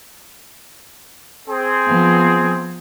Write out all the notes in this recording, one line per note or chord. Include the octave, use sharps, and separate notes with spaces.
C4 G#4
F3 B3